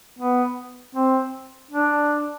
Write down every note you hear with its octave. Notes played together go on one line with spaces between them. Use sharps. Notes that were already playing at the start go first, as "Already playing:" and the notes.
B3
C4
D4